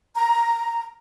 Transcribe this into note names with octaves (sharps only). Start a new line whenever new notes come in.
A#5